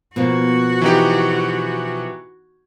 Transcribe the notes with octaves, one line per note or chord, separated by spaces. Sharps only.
B2 F3 A#3 F#4
E3 D#4 G4